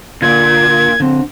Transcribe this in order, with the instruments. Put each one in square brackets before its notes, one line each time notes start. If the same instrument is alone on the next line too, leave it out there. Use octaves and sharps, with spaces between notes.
[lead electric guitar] A#2 [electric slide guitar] D3 F4 D5 [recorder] G#6
[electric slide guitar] D3 C4